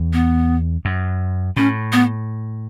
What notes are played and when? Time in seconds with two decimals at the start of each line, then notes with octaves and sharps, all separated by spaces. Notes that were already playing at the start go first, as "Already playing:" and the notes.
Already playing: E2
0.13 B3
0.85 F#2
1.57 A2 C#4
1.92 B3